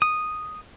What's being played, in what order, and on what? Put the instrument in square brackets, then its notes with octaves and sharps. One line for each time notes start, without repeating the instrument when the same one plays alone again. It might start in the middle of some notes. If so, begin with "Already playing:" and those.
[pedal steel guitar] D#6